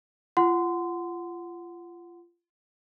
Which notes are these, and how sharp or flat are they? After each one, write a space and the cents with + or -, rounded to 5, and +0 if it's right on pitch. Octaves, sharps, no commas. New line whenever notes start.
F4 -25 F#5 +0 C6 -20